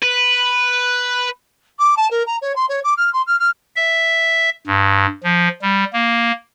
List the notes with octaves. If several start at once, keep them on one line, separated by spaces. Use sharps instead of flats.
B4
D6
A5
A#4
A#5
C#5
C6
C#5
D6
F6
C6
F6
F6
E5
G2
F3
G3
A#3